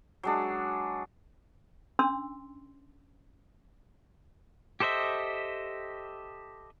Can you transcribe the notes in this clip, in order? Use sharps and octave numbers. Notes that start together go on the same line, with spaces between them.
F#3 G#3 D4
C#4 D4 C6 E6
G4 A4 C5 D#5 E5